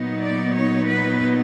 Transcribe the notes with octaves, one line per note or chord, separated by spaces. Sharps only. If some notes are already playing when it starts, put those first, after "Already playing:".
Already playing: A#2 F#3 B3 D#4
D5
C#5
B4